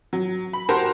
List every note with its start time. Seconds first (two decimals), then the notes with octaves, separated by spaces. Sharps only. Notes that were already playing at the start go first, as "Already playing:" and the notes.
0.13 F#3
0.53 B5
0.69 F#4 G4 A#4 C5 A5